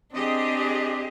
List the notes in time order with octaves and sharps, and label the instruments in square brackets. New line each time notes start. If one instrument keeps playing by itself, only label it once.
[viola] C4 D4 [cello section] G4 G#4 D#5